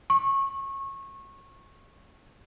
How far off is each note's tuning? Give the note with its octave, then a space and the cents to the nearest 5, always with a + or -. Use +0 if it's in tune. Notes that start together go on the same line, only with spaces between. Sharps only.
C#6 -25